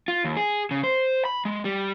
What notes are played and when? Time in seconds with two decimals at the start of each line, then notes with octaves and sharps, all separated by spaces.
0.08 F4
0.25 D#2
0.37 G#4
0.71 C#3
0.84 C5
1.25 B5
1.45 G#3
1.65 G3